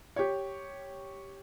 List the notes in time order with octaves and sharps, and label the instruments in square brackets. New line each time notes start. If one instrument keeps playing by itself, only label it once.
[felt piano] G4 C#5